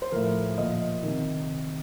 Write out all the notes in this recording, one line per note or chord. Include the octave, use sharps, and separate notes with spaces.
C5
A2 F3 A#4
A#2 F3 D#5
C3 D#3